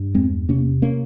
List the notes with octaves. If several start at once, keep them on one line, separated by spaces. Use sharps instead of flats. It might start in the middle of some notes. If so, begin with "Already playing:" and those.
Already playing: G2
E2 G#3 C4
C3 A#3 C#4
A#3 C#4